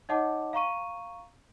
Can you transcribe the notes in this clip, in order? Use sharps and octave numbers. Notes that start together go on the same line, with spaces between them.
D#4 C#5 D#5 F#5 A5 D6
F5 A#5 C#6 D#7